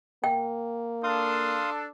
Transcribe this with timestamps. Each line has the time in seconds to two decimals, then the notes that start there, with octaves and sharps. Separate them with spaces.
0.24 A#3 G5
1.04 D4 A4 F5 C6 D#6